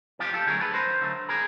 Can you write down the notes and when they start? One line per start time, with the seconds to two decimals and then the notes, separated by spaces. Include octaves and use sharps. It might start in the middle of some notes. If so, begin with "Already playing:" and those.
0.19 F2 F4 G4
0.33 G4 A4
0.47 D3 F#3 A3 G#4 A#4
0.60 A4 B4
0.74 F2 A#4 C5
1.02 D3 F#3 A3
1.29 G#4 A#4